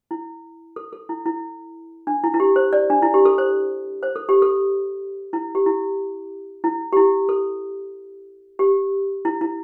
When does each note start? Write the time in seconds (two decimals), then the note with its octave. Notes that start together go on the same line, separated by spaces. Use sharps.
0.11 E4
0.76 A4
0.93 A4
1.09 E4
1.26 E4
2.07 D4
2.24 E4
2.34 E4
2.40 G4
2.56 C5
2.73 D5
2.90 D4
3.02 E4
3.14 G4
3.25 A4
3.38 C5
4.03 C5
4.16 A4
4.29 G4
4.42 A4
5.33 E4
5.55 G4
5.66 E4
6.64 E4
6.93 G4
6.97 E4
7.29 A4
8.59 G4
9.25 E4
9.41 E4